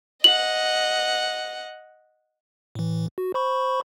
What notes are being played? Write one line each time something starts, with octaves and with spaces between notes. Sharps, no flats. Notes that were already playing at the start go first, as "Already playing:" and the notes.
D#5 F#5 F#7
A2 E3
F#4
C5 B5 C#6